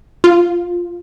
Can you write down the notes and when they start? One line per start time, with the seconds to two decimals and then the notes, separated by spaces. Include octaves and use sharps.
0.24 F4